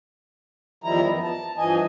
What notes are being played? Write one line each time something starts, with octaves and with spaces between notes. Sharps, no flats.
E2 D#3 F3 G3 E4 A#5
F#2 B3
A5
G2 E3 F3 D#5 G#5